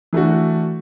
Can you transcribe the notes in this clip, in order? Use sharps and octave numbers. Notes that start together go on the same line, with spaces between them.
E3 A3 D4 F#4